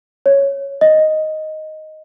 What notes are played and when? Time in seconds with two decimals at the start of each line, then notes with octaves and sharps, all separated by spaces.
0.26 C#5
0.81 D#5